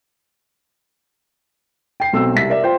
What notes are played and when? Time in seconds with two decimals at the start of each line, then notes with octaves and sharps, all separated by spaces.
2.00 G5 C7
2.13 B1 C4 A4 E6
2.35 C2 E5 B6
2.49 A#4 D5 E5
2.63 F4 C5 G5